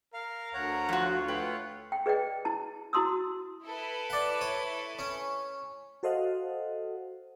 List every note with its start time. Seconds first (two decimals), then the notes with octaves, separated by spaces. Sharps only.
0.14 A#4 F5
0.54 D2 C#5 F#5 A#5
0.89 F3 F4 F#4
1.28 A3 B4 C#5 F#5 G5
1.92 G5
2.06 G#4 B4 D5 D#5 G5
2.45 E4 A5
2.93 E4 F#4 A5 C6 D#6 E6
3.64 E4 A4 B4
4.10 D5 F#5
4.41 C#5
4.99 C#4
6.03 F#4 A4 C5 D#5 F5 F#5